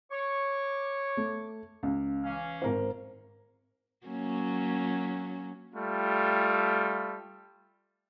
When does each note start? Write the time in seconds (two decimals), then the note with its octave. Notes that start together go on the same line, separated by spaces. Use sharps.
0.11 C#5 C#6 D6
1.17 A3
1.83 C#2
2.24 E3 C#4 F5
2.62 G#1 A#4 C5
4.06 F#3 A#3 C#4
5.74 G3 A3 F4